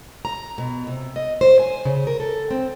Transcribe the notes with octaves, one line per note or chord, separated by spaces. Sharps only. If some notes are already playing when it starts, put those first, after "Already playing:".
A#5
B2
C3
D#5
C5
G#5
C#3
A#4
A4
C4